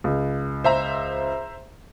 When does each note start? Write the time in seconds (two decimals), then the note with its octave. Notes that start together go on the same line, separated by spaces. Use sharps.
0.04 C#2
0.64 C5 E5 A#5